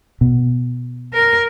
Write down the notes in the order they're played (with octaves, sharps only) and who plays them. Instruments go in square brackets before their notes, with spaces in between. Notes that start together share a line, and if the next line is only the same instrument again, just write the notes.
[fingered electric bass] B2
[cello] A#4